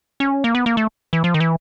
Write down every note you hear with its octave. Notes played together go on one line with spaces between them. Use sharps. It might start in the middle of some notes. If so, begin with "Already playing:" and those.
C#4
A#3
B3
A#3
A3
E3
F3
D#3
E3